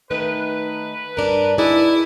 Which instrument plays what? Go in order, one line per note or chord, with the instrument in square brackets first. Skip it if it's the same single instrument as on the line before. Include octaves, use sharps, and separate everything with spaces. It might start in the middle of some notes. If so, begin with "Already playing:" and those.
[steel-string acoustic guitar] D#3 A3 D#4 [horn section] B4
[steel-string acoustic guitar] G2 D4 [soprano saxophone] A#4
[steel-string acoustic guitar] D#4 G#4 D5 [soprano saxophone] E4